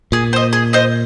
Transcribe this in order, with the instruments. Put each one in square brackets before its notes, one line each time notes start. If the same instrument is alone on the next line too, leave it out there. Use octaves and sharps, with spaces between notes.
[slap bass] A#2 [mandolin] G#4
[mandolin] C5 D#5
G#4
C5 D#5